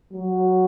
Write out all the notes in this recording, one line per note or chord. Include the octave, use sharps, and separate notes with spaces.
F#3